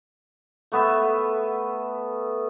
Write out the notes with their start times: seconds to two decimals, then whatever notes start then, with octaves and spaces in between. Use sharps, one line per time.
0.72 A3 B3 E5